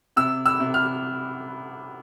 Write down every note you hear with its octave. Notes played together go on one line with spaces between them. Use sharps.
C3 E6
E6
C3
F6